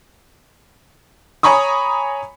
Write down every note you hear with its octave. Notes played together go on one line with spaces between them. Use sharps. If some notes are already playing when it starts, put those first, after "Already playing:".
C#5 G#5 A#5 B5 C#6 D#6